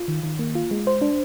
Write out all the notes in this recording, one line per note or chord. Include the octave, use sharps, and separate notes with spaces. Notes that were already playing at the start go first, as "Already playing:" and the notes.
Already playing: F4
D#3
D#3
A#3
F4
G#3
C5
D4